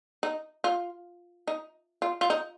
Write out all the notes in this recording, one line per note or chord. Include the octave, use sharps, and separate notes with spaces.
D#4
F4
D#4
F4
F4
D#4